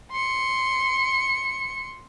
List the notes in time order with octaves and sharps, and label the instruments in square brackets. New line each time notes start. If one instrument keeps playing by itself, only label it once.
[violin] C6 C#7